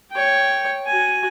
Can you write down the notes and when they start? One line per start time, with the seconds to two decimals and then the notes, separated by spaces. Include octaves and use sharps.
0.12 C#5 G5
0.87 F#4 G#5